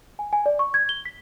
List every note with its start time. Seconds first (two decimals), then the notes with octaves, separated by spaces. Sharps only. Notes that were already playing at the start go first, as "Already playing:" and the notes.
0.19 G#5
0.33 G#5
0.46 D5
0.59 C#6
0.74 G#6
0.89 G7
1.05 B6